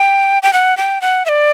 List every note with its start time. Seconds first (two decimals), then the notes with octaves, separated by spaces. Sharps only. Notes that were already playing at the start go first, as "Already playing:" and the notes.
Already playing: G5
0.43 G5
0.53 F#5
0.77 G5
1.02 F#5
1.26 E5
1.29 D5